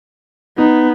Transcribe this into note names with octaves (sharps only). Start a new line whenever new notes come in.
B3 D#4